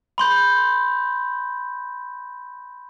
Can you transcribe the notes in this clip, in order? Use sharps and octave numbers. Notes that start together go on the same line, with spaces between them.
B5 C6 G6